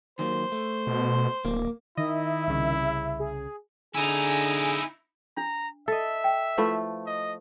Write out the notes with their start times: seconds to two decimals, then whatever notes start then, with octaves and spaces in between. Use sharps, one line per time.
0.19 D#3 F#3 A#3 C5
0.52 A3
0.87 B2
1.45 D1 A#3
1.97 D#3 E4 D#5 E5
2.47 C2 C#3
3.20 G#4
3.95 D3 D#4 E4 G#4 G#5
5.37 D4 A#5
5.88 A4 D#5 E5
6.24 G5
6.58 F3 A3 E4 B4 F5
7.06 D#5